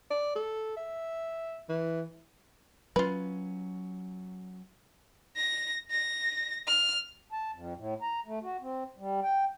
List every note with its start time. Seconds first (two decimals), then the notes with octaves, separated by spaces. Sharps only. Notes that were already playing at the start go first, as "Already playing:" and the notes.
0.11 D5
0.35 A4
0.77 E5
1.69 E3
2.96 F#3 C#4 F4 B4
5.37 A#6
5.91 A#6
6.67 F6
7.32 A5
7.53 F2
7.76 A2
8.02 A#5
8.26 A3
8.42 F#4
8.61 C4
8.98 G3
9.23 G5